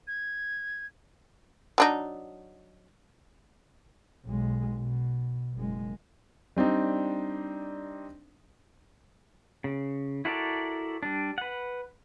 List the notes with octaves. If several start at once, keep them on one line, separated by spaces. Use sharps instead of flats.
G#6
F#3 D4 D#4
B1 G#3
B2
F#1 G#3
G3 C4 D4 D#4
C#3
E4 F#4 A4 A#4 D5
G3 D4
B4 F#5